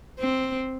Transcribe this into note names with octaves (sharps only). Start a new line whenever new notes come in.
C4